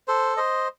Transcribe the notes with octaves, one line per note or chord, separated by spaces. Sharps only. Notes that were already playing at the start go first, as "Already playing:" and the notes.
A4 C5
C5 D#5